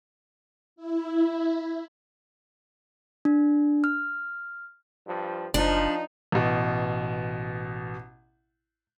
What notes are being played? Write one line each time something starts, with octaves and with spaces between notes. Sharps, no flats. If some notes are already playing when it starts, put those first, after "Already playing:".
E4
D4
F6
G2 F3
F#1 F3 D4 D#4
A1 B2